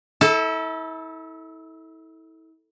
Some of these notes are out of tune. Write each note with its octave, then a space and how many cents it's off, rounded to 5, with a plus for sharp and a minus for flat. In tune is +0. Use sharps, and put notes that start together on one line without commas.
E4 -35 A4 +0